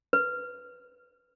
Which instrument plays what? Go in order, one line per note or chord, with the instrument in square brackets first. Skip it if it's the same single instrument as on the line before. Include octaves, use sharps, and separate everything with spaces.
[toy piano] B4